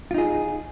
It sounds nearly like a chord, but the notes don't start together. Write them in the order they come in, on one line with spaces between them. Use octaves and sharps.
F4 D#4 G#4